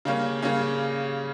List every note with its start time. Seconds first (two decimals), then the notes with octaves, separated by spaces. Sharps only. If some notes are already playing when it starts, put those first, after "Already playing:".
0.05 C#3 G3 A#3 C#4
0.42 C#3 G3 A#3 C#4